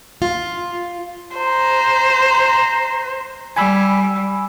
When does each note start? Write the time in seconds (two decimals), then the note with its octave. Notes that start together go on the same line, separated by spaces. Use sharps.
0.22 F4
1.37 C5 A#5
3.56 G3 G#5 B5 E6